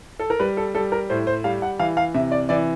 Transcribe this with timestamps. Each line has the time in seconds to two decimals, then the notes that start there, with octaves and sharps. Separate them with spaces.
0.20 A4
0.30 A#4
0.39 G3 B4
0.57 A4
0.75 G3 A4
0.92 A#4
1.10 A2 C5
1.27 C5
1.44 G3 F5
1.62 F#5
1.79 E3 F5
1.97 F5
2.14 C3 E5
2.32 D5
2.49 E3 D5